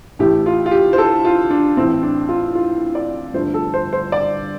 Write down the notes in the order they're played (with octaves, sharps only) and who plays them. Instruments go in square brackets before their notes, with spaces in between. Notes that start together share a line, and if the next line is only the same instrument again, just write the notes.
[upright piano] A1 A2 A3 G4
F4
F4
G4
C5
A4
F4
D4
A1 A2 A3 C4
D4
F4
F4
D5
G1 G2 D3 F3 A3 C5
A4
C5
C5
D5